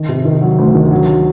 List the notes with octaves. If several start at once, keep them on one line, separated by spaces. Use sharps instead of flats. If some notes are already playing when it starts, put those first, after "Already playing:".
Already playing: D#3
C3
D#3
F#3
D2
D#3
F#3